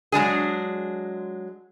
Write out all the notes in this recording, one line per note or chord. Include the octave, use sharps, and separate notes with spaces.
F#3 G#3 D4 G#4